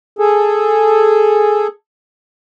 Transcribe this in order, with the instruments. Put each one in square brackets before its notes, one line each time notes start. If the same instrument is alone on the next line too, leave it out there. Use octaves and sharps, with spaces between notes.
[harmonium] G#4 A4